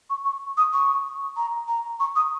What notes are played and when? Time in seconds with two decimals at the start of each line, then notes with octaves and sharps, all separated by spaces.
0.10 C#6
0.25 C#6
0.57 D#6
0.73 C#6
1.37 A#5
1.68 A#5
2.00 C#6
2.16 D#6